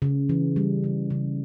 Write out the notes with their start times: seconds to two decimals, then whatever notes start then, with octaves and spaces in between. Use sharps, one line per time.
0.02 C#3
0.29 E3
0.56 G3
0.84 C#3
1.10 C#3